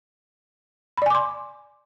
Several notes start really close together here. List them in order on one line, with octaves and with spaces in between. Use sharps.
B5 D5 G#5 D6 C6